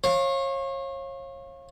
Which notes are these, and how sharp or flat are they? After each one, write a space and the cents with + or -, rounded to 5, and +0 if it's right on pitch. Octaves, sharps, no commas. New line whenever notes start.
C#5 -35 F5 +0